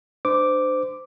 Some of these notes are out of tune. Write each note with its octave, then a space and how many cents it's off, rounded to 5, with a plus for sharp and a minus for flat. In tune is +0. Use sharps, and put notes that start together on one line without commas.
D4 +25 C5 -25 D6 +0